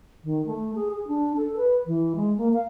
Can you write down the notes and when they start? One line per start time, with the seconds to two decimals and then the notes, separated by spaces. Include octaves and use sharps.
0.24 D#3
0.46 A3
0.75 G#4
0.91 G#4
1.07 D4
1.37 A4
1.56 B4
1.86 E3
2.15 G#3
2.38 A#3
2.53 F5